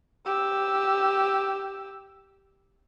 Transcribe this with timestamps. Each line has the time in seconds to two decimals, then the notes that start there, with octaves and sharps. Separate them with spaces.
0.26 G4 E6